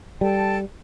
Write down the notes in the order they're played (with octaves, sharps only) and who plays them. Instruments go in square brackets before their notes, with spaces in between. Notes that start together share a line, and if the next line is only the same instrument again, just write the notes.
[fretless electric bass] G3 [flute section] A4 G5 A5